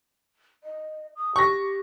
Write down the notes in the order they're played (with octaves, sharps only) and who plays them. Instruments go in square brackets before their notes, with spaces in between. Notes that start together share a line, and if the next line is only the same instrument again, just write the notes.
[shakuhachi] D#5
D#6
[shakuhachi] G4 [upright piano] C#6 A#6